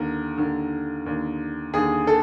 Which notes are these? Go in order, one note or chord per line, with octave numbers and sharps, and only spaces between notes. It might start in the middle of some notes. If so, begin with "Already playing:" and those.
Already playing: D#2 D3 A#4
D#2 D3
D#2 D3
D#2 D3 G#4
A4